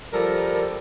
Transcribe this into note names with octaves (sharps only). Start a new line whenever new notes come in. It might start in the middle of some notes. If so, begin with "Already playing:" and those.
F3 G3 A4 A#4